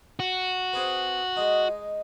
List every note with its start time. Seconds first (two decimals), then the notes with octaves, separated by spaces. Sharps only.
0.20 F#4
0.73 C4 G#4 B4
1.36 G#3 D#4